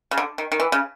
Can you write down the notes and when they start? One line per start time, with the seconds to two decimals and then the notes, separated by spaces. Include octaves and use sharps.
0.11 C#3
0.18 D3
0.38 D#3
0.52 D#3
0.60 E3
0.72 C#3